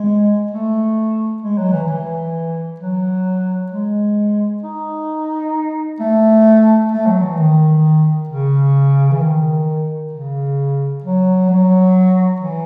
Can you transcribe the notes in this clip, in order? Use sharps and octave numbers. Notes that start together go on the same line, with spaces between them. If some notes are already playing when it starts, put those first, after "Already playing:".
Already playing: G#3
A3
G#3
F#3
E3
E3
F#3
G#3
D#4
A3
A3
F#3
E3
D#3
C#3
E3
D#3
C#3
F#3
F#3
E3